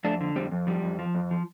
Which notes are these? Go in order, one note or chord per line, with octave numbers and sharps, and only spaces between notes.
F2 A3 D4
D3
F2 G3 C4
F2
F3 G3
F2
F3
F2
F3